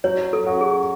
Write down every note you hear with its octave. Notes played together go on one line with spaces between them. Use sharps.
F#3 C#5
A4
C#4 F#4
G#4